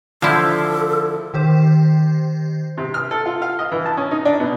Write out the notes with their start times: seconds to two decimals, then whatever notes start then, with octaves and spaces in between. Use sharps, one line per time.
0.22 D3 F3 E4 A4 C5 F5
1.34 D#3 G4 C5
2.77 C3
2.94 F6
3.11 A4
3.26 F4
3.42 F5
3.59 D#5
3.71 E3
3.86 A5
3.97 C#4
4.11 D#4
4.25 D4
4.40 B2